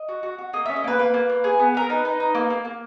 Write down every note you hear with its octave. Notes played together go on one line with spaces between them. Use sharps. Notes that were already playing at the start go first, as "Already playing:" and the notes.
Already playing: D#5
F#4
F#4
F#4
A#3 D#5
E5
C#4
D#5
A#3 B4
A#3 B4
A#3
A#3
G#4
B3
B3 A#4
D#4 B4
D#4
D#4
A#3
A#3
A#3